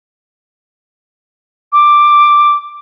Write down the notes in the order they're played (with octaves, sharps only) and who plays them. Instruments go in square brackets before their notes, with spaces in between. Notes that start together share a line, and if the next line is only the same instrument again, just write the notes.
[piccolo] D6